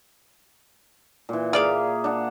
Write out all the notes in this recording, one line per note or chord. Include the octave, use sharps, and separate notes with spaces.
A#2 E3
A#3 F4 G#4 D5 E5 F5
D4 F#5